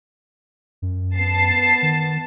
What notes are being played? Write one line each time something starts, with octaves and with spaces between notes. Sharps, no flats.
F#2
B3 A5 C7
D#3